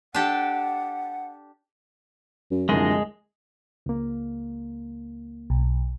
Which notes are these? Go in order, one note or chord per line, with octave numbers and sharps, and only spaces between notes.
D4 G4 A4 F#5
F#2
C2 F#2 D3 F3 G#3 D#5
C#2 A#3
B1